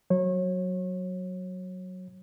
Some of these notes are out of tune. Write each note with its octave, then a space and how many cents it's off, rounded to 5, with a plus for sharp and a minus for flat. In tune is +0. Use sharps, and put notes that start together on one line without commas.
F#3 +0 C#5 -30